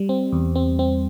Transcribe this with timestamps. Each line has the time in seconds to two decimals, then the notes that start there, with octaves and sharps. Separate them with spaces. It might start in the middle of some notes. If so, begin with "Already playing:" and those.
Already playing: G3
0.09 C4
0.33 E2
0.55 C4
0.79 C4